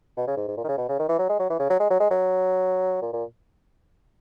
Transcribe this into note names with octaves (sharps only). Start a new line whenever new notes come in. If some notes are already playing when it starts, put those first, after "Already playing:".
B2
C#3
G#2
G#2
A#2
D#3
C#3
B2
C#3
D#3
E3
F#3
G#3
F#3
E3
C#3
F#3
G#3
F#3
G#3
F#3
A#2
A#2